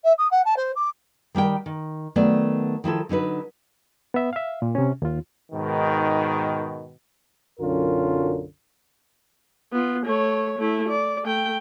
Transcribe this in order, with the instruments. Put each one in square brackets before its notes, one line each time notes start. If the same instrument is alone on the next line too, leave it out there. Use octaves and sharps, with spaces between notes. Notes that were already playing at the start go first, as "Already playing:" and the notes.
[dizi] E5
D#6
F#5
A5
C5
D6
[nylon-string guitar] D#3 G3 A#4 G5
D#3
D#3 F#3 A3 B3 D5
D#3 F3 E4 A4
D3 F#3 D#4 B4
[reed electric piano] B3 E5
E5 F5
A#2
C3 C#4
D#2 F4
[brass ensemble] G#2 B2 D#3
[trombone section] B1 F#2 D3 C#4 F4 A#4
[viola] B3 F4
A3 C#5
A3 E4
D5
A3 G5